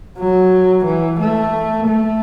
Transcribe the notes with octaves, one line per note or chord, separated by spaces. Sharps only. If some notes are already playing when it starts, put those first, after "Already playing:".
F#3
E3
A3
A3